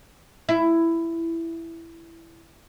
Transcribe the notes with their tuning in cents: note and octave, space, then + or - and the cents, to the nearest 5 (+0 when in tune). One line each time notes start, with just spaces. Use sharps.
E4 +10